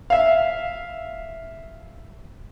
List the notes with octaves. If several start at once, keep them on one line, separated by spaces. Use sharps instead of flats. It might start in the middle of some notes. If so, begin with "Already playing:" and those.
E5 F5